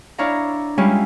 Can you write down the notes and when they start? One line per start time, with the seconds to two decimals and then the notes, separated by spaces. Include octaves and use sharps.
0.18 D4 E4 C#5 F5 A#5
0.78 G3 G#3 C#4 E4 F4